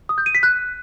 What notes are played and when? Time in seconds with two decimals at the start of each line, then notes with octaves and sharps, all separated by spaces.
0.09 D#6
0.18 G6
0.26 D#7
0.35 B6
0.43 F#6